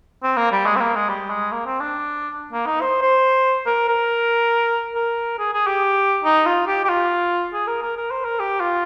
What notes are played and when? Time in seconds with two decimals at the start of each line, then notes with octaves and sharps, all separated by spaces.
0.23 C4
0.37 A#3
0.52 G3
0.66 G#3
0.76 C4
0.81 A#3
0.95 G#3
1.09 G3
1.30 G#3
1.52 A#3
1.66 C4
1.81 D4
2.53 A#3
2.66 D#4
2.81 C5
3.02 C5
3.66 A#4
3.89 A#4
4.95 A#4
5.39 G#4
5.53 G#4
5.67 G4
6.24 D#4
6.46 F4
6.67 G4
6.85 G4
6.89 F4
7.54 G#4
7.67 A#4
7.82 A#4
7.97 A#4
8.11 C5
8.25 A#4
8.40 G4
8.60 F4